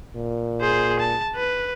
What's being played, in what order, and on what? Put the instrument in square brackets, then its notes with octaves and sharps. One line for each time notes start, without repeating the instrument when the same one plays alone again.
[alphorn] A#2
[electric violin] G#4 C5
A5
B4